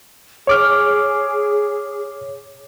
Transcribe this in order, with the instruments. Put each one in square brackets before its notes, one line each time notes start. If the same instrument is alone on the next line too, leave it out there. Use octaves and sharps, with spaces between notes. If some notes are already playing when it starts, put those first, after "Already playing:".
[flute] G#4 [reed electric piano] C#5 D6 F6